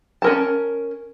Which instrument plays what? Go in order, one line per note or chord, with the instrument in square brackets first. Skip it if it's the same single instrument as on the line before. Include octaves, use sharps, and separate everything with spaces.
[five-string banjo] C#4 A#4 A5